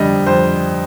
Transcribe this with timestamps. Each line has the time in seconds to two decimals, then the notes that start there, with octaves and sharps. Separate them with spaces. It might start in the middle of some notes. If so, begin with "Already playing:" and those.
Already playing: F2 D3 G3 D#5
0.27 F2 C5